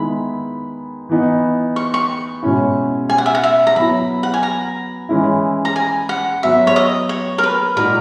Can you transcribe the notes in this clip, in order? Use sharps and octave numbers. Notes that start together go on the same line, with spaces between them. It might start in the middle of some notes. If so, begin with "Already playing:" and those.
Already playing: D#3 G#3 B3 E4 B5
E3 B3 D#4
C#6
C#6
B2 G#3 C#4 E4
G#5
F#5
E5
F#5
E5
A#5
F#3 B3 E4 B5
F#5
G#5
A#5
E3 G#3 C#4 E4
A#5
G#5
F#5
F#3 B3 F#4 E5
C#5
D#5
C#5
A#4
B4
A#2 G#3 D#4 F#4 A#4